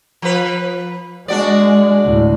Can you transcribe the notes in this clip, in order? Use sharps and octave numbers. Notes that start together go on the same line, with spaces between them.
F3 B4
G#3 D4 F#4 D5
D2 A2